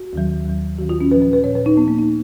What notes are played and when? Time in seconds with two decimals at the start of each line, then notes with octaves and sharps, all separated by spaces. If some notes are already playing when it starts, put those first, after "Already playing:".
Already playing: F#4
0.13 D#2 D#3 F#3
0.46 D#2 D#3 F#3
0.78 D#2 D#3 F#3 F#4
0.89 F4
1.01 C#4
1.11 A#2 F3 B4
1.22 B4
1.33 B4
1.44 A#2 F3 C#5
1.55 B4
1.66 D#4
1.77 F3 B3
1.81 A#2
1.88 A#3
1.99 D#4